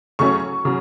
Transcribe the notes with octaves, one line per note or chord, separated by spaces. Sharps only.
C#3 F#3 A3 C#4 C#6
C#3 F#3